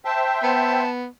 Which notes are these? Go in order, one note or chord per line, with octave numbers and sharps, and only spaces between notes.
C5 E5 G5 A5
B3 A5